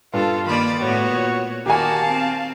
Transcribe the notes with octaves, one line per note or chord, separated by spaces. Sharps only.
G2 F4 A4
D#3 A#3 F4 D5 B5
A2 B3 F#4 C#5
A#2
D#3 A#3 F#4 G4 F5 G#5 A5
C4